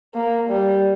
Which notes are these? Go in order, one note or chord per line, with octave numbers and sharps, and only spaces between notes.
A#3
G3